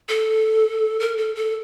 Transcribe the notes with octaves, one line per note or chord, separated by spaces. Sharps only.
A4
A#4
A4
A4